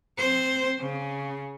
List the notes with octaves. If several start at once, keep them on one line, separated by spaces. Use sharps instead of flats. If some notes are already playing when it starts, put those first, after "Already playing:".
C4 C5
C#3